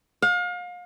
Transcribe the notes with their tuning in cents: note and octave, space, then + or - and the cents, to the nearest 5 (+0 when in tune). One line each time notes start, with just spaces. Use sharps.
F5 +35